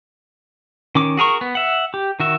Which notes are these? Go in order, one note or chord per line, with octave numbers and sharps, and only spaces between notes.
D#3 C#4 D6
F#4 G#4 A#4 C#6
B3
E5 F#5
G4
D#3 F#4 E5